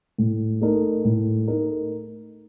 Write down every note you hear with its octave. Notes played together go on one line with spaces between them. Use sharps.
A2
A3 D#4 A#4
A2
A3 D#4 A#4